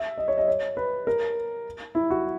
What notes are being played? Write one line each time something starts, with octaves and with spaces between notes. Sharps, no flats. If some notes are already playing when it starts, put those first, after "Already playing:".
Already playing: E5
D#5
C#5
D#5
C#5
B4
A#4
E4
F#4